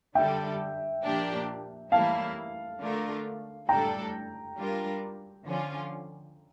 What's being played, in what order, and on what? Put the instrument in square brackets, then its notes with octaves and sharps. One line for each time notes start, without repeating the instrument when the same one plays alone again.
[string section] D3 G3 D4 A4 [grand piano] E5 G5
[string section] A#2 F3 A#3 D4 G4
[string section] A2 E3 G3 A#3 E4 [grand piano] F5 A5
[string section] D3 A3 D4 F4 A#4
[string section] A2 G3 D4 A4 [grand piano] G5 A#5
[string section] G3 D4 F4 A#4
D3 F3 C#4 F4